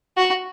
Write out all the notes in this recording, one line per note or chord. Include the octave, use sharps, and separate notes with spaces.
F#4